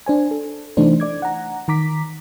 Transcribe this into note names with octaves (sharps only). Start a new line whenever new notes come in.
D4 C5 G#5
A4
C3 E3 A3 D4 D#4 C5
D5 D6 G#6
F#5 A#5
D#3 A#5 D6 B6